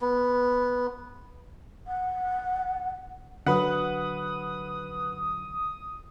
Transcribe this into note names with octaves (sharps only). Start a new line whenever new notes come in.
B3
F#5
D3 F#3 B4 F#5 D#6